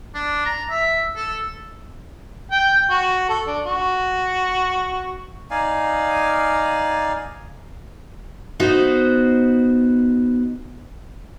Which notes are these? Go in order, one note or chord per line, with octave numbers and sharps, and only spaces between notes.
D4
A#5
E5
A4
G5
F#4
A4
D4
F#4
D#4 D5 F5 G#5
B3 D#4 F#4 C5